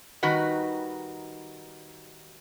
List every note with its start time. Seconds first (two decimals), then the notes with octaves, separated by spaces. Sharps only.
0.23 D#3 G3 D#4 F#4 B4